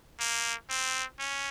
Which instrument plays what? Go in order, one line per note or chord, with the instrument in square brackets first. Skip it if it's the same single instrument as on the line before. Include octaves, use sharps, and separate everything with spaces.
[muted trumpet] A#3
C4
C#4